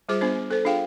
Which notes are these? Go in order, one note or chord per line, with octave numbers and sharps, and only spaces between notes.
G3 F4 G#4 C5 D6
B3 D4 C5
A4 C5
D4 F4 G#4 F5 G5